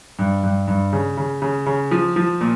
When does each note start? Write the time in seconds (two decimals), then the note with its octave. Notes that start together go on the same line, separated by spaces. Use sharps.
0.19 G2
0.43 G2
0.68 G2
0.93 C#3
1.17 C#3
1.42 C#3
1.66 C#3
1.91 F3
2.16 F3
2.41 A#2